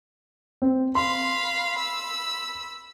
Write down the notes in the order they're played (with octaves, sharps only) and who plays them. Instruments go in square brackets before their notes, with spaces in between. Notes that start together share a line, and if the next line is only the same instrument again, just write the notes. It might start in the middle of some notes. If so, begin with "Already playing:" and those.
[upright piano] C4
[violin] F5 B5 [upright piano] C6
[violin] B5 E6